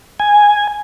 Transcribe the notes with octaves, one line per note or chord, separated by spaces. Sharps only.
G#5